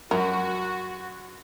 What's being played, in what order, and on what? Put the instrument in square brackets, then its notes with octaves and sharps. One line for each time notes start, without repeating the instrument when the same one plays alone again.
[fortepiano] F#2 [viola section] F#4 [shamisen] A#4